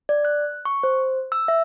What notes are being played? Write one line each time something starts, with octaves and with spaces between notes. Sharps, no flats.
D5
F#6
C#6
C5
E6
E5